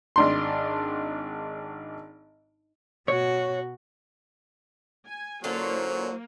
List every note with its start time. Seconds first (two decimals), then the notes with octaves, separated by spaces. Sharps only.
0.16 G#1 D4 C6
3.08 B2 F#4 C#5
5.06 G#5
5.44 D3 F#3 A#3 C#4 E4 F4 C5